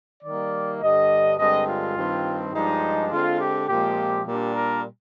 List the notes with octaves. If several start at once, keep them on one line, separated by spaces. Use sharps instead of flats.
D#3 G3 A#3 D5
G2 D3 G3 D#5
G2 D3 G#3 C4 D#5
F4
G2 D#3 G3 C4
G2 F3 G#3 D4 D#4
D3 G#3 C4 F4
G4
A#2 F3 G#3 C4 G4
A#2 G3 D4 G4
A#4